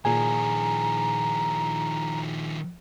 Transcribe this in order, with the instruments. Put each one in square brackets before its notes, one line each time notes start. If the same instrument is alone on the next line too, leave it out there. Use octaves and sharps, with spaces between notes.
[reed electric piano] A#2 G#4 G#5 [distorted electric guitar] D#3 F3 [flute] A#5